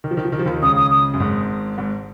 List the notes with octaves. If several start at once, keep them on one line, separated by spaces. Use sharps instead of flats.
D#3
F3
D#3
F3
D#3
F3
D#2 D#3
C#2 C#3 D#6
D#6
D#6
F#2
G#1 G#2
G#1 G#2